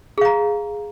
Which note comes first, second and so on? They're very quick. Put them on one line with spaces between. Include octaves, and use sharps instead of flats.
G#4 F5 A#5